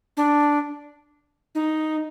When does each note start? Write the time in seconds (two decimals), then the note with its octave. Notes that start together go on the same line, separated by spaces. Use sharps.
0.17 D4
1.55 D#4